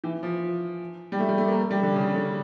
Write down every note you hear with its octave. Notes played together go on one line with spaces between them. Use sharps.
E3
F3
G3
A3
G3
A3
A#3
G3
D3
C#3
D3